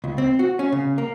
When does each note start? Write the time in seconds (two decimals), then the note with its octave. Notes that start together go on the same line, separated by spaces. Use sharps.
0.04 C#2
0.18 C4
0.39 F#4
0.59 C#4
0.72 C#3
0.98 A#3